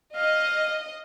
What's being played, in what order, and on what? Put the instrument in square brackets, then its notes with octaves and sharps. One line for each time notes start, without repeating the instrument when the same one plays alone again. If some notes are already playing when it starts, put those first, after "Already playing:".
[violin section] D#5 [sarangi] F5